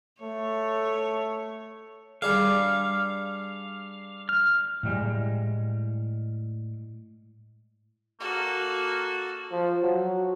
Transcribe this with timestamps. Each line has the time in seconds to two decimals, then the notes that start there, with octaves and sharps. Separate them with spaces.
0.22 A3 C#5
2.22 G3 D4 G#4 F5
4.29 F6
4.83 A2 G3 G#3
8.20 A#3 F#4 A4
9.52 F3
9.83 F#3